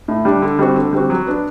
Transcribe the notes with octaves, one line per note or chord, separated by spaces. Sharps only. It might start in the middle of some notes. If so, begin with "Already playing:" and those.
A2
G3 D4
D3
G3 C4 F#4
D3
G3 C4 F#4
F#3
B3 D4